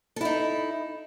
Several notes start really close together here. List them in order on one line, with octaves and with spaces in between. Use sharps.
A4 E4 D#4